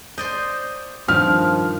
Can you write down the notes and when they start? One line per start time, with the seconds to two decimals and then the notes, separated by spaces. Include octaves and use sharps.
0.18 C5 D5 D#5 G6
1.08 G2 D#3 F3 F6